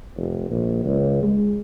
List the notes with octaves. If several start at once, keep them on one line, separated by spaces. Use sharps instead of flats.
F1
A#1
C#2
G#3